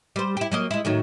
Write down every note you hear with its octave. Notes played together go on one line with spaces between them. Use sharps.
G3 C5
E4 G4
F#3 A#3 D#5
G#3 E4
A2 D#3 F#3